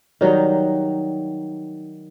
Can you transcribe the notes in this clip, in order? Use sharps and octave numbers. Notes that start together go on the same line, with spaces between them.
D#3 F#3 G3 D#4